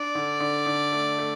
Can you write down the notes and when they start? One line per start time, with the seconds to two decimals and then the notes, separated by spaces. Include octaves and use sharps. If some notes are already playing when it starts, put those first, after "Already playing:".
Already playing: D4 D5
0.15 D3
0.40 D3
0.66 D3
0.92 A3
1.18 A3